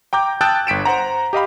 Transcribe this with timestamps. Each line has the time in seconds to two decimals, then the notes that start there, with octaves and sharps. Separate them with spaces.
0.13 G5 A#5 D6 G6
0.41 G5 A5 D#6 E6 F#6 A6
0.67 G1 B6 D7 E7
0.85 C5 F#5 A#5
1.33 G4 D#5 F5 B5